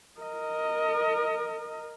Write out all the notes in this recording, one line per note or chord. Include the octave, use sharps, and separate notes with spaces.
A#4 D#5